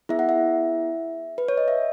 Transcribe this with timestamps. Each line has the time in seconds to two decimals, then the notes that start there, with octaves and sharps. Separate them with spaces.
0.09 B3 E4 G#4 E5
0.19 F#5
0.29 E5
1.38 B4
1.48 C#5
1.57 D#5
1.68 E5